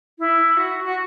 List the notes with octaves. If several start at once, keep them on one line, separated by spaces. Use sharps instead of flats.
E4
F#4
F#4